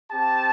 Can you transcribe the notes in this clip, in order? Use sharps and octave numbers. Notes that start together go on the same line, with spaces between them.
C4 G4 A5